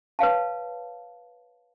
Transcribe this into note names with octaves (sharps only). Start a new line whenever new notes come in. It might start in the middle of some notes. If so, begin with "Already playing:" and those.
B4 C#5 F5 A5